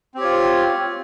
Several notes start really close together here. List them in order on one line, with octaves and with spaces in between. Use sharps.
C4 G4 C#5 F4